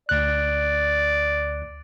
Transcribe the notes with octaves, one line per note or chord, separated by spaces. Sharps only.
D2 D5 F#6